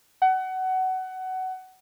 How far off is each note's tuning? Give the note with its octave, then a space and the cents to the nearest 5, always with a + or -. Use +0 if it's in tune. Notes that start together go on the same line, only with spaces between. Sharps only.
F#5 +20